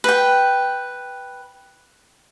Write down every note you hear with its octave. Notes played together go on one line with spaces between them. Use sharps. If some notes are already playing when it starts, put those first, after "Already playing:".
B4 G5